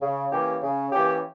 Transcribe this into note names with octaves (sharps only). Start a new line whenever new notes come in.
C#3
E3 A#3 C#4 G4
C#3
E3 A#3 C#4 G4